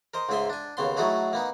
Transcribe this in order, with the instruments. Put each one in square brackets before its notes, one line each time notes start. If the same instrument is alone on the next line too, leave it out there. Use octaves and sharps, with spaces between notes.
[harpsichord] A#4 C5 D#5
C#2 G#2 G#4 E5 G#5 C6
D4 G#5
D#2 C#3 B3 C6
F#3 A3 D#4 E4 F#4 G#4
A#3 B3 D#4